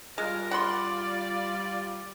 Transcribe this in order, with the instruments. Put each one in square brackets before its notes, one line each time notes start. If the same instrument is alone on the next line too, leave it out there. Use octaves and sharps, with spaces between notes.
[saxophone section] G3 F4 [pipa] G#3 [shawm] A#4
[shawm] D5 [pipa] F#5 B5 C6